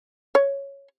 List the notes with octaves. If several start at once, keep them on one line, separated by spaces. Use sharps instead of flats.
C#5